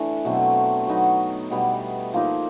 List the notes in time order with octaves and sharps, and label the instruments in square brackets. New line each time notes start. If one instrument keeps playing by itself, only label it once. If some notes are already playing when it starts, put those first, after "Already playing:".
Already playing: [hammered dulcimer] E3 A3 D4
B2 F#3 A3 C4
F#3 B3 D#4
B2 G3 B3
F3 A#3 D#4